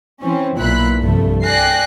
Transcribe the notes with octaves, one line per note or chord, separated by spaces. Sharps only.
E3 C4 C#4
B1 A#2 E4 B5 F#6
C2 G2 F3 A3
D5 G5 G#5 F#6 A#6 C7